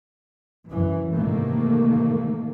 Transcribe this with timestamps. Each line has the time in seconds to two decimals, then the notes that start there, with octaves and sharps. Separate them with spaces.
0.68 F#2 E3
1.13 G#2 C3 D#3 E3 A3 A#3